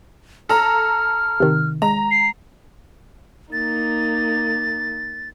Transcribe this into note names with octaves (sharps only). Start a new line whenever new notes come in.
A4 A#5 F6
C3 D#3
G#3 A#5
C7
A#3 D#4 A6